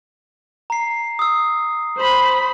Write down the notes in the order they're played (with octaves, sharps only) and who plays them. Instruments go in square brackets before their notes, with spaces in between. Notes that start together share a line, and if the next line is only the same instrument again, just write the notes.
[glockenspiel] A#5 C7
D#6 E6
[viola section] C5 B5